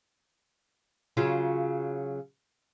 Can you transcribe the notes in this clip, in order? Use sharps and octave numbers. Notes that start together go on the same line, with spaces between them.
C#3 F#3 F4